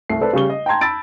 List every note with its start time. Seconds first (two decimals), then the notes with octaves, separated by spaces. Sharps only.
0.09 C2 A3 C7
0.21 A4 B4 C5 D5
0.33 C#3 G3 C#6 G7
0.50 D#5
0.66 G5 A5 A#5 C6 G#6
0.81 A5 B5 E6 A6 D7